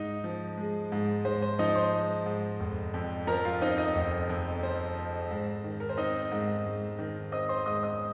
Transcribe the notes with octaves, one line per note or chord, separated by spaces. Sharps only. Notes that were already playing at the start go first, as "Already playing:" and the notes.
Already playing: G#2 D#4 D#5
F3
G#3
G#2
G#2 C5
C5
F3 D#4 D#5
C5 C6
G#3
G#2
F1
F2
F3 A#4 A#5
F4 F5
C4 D#4 D#5
D#4 D#5
F1
F2
F3 C5
C4
G#2
D#3
A#4
C5
C4 D#4 D#5
G#2
G#2
D#3
C4 D#5 D#6
C5 C6
G#2 D#5 D#6
D#5 D#6